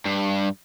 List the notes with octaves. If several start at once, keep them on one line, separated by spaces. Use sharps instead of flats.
G2